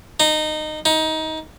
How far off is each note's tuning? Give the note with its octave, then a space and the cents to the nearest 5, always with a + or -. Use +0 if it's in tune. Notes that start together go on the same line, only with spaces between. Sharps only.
D#4 -20
D#4 +20